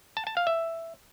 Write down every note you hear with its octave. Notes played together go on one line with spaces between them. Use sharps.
A5
A5
F5
E5